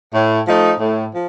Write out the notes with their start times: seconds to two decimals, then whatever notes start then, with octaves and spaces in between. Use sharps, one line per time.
0.14 A2
0.47 F3 A3 D#4
0.79 A2
1.13 F3